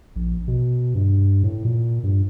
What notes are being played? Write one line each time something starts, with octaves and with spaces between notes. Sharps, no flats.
A#1
B2
G2
A2
A#2
G2